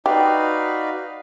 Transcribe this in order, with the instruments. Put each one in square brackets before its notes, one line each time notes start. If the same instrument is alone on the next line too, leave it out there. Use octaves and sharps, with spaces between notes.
[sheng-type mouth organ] D#4 F#4 B4 D5 F5 [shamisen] G4